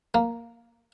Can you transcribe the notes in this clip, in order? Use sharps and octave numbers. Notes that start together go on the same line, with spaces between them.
A#3